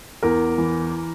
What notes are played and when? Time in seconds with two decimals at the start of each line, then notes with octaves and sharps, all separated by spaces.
0.23 E2 A#4
0.58 E3